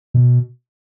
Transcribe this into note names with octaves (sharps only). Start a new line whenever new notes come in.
B2